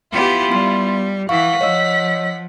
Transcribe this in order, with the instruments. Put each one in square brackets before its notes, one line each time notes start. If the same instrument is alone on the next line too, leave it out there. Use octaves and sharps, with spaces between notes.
[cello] B3 G4 [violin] E4 F4
[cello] G3 [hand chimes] B3 C6
[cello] E3 [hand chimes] F5 C#6 [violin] F#5 B6
[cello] F3 [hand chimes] C#5 D#5 E6